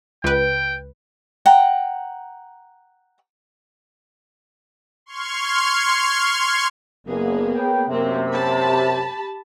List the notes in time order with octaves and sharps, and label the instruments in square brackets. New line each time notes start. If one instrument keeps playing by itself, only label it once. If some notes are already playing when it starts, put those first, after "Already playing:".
[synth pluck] C#2 B4 [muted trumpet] G5
[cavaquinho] F#5 G5 A#5
[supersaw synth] C6 C#6 F6 G#6
[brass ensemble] F#1 [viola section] A#3 B3 G#4
[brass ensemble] B4 C#5 G5
[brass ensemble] F#2 C3 [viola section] A#3 C4
[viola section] G4 A5 B5